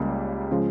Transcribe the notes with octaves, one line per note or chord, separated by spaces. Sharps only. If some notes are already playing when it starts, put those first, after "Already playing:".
Already playing: C#2 C#3 G3 A#3
C#3 F3 G#3